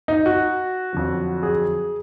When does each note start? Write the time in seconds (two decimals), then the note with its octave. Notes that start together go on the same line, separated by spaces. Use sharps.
0.08 D#4
0.26 F#4
0.93 F2 D3 F#3
1.43 G#4